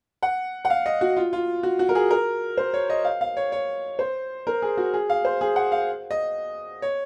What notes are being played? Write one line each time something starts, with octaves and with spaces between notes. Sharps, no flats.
F#5
F#5
F5
D#5
F#4
F4
F4
F#4
F#4
A#4
G#4
A#4
C5
C#5
D#5
F5
F5
C#5
C#5
C5
A#4
G#4
F#4
G#4
F5
C5
G#4
F#5
F5
D#5
C#5